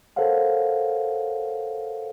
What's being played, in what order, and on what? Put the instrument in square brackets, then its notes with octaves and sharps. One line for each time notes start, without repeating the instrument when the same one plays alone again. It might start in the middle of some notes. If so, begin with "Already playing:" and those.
[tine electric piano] A4 A#4 C5 C#5 F5 F#5